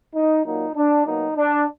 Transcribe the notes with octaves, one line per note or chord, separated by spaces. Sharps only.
D#4
A#2 F#3 A#3 D#4
D4
B2 F#3 A#3 D#4
D4